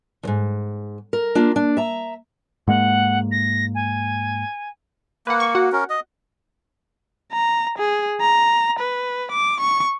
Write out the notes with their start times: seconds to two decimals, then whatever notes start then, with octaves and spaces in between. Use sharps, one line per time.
0.23 D#2 G#2
1.13 A#4
1.35 A#3 D4 F4
1.56 D4
1.77 E5 A#5
2.67 G#2 G#3 A#3 F#5
3.31 A#6
3.74 G#5
5.27 A#3 B4 F#5
5.40 C#6
5.55 F#4 F#5
5.72 C#4 A#4
5.90 D#5
7.33 A#5
7.79 G#4
8.21 A#5
8.79 B4
9.32 D6
9.60 C#6